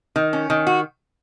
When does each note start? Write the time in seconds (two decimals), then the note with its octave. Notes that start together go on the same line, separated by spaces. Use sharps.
0.16 D#3
0.33 C#4
0.50 D#3
0.67 F#4